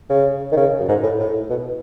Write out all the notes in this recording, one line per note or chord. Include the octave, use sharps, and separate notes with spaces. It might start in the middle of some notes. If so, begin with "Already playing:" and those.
C#3
D#3
C#3
F#2
G#2
A2
A2
B2